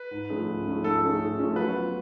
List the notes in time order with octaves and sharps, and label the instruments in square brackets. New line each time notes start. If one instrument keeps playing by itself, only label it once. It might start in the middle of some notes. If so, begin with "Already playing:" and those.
Already playing: [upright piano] B4
[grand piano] G#2
F3 A3 C#4 G#4
G#2
F3 A3 C#4 G#4
[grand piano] G#2 [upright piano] A4
[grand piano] F3 A3 C#4 G#4
G#2
F3 A3 C#4 G#4
[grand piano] F#3 [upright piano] B4
[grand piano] B3 F4